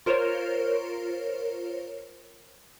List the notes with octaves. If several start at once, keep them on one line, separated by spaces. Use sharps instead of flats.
F4 A#4 C5 C#5